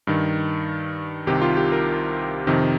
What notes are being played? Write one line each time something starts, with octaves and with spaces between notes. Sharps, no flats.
G2 D#3
C2 C3 D#3 G4
F4
G4
A#4
F2 C3 D#3